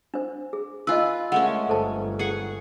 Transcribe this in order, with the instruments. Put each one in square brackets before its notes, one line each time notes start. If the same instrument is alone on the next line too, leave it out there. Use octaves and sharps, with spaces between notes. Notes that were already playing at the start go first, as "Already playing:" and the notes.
[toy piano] D4 C5
G#4
[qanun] F4 B4 [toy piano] D#5 G#5 E6
[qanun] G#3 A3 C#4 [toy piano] A#4 F#5
[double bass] G1 [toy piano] A4 C5 A5
[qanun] G#4 F#5 C#6